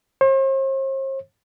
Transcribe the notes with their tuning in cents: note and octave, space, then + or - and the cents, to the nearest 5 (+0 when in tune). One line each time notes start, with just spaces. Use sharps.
C5 +45